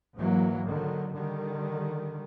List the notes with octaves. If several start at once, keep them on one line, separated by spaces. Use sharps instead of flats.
G#2 E3 F#3 A#3
D3 D#3 F#3
D3 D#3 G3